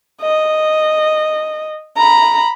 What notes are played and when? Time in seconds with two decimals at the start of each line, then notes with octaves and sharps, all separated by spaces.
0.22 D#5
1.97 A#5 B5